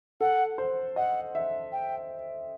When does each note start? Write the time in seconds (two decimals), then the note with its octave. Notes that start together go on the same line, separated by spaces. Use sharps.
0.21 A4 F#5
0.58 C5
0.96 D#5 F#5
1.35 E5
1.72 G5